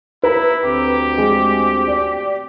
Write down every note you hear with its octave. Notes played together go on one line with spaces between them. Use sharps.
E4 B4 A#5
D2 C4 G4
G#3
D5